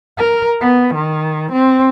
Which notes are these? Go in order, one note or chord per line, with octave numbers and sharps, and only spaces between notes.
A#4
B3
D#3
C4